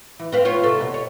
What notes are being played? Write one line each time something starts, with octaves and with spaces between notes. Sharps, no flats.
E3
C4 B4 F5
F4 C5 C#5
C3 A4
B2
C#5